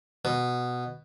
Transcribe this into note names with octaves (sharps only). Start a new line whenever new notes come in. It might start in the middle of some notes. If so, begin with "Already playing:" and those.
B2